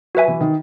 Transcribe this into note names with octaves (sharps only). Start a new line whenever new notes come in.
F#3 F#4 B4 E5 G#5
E3
D#3